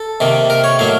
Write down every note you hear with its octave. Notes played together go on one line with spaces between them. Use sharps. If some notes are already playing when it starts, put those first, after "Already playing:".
Already playing: A4
C3 D#3 A#3
A#4
C#5
A2 F#3 A#3 F5